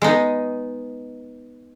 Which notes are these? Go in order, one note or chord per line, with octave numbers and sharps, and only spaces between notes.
G#3 B3 D#4